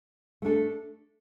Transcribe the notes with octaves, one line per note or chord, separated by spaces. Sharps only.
A3 D4 A4